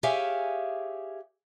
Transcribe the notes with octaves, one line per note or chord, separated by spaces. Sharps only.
G4 G#4 C#5 E5 F5 G#5